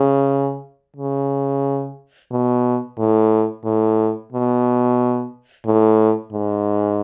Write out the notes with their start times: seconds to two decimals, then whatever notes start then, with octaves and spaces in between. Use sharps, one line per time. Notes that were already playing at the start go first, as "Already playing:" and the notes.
Already playing: C#3
0.97 C#3
2.31 B2
2.98 A2
3.64 A2
4.32 B2
5.66 A2
6.33 G#2